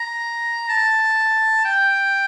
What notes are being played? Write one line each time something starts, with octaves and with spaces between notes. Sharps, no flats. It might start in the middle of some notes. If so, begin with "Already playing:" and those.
Already playing: A#5
A5
G5